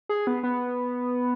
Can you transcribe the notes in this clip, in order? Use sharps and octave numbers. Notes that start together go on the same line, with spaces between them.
G#4
B3
B3